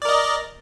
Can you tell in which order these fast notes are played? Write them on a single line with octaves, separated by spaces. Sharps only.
D5 A#4 D#5